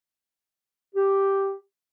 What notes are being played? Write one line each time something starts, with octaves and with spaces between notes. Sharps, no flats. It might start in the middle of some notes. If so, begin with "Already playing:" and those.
G4